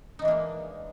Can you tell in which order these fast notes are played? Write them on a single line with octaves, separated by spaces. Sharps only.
D#4 E3 D4 A#3 G#3